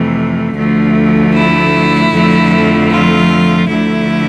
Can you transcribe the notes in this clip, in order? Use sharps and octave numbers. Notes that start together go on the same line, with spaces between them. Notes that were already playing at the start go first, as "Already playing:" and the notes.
Already playing: F2 C3 E3 A3
D2 D3 F3 A3
E4
F2 D3 F3 A3
F4
D2 D3 F3 A3 E4